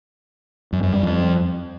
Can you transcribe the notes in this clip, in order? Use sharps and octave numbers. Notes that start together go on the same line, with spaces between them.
F#2
F#2
G3
F2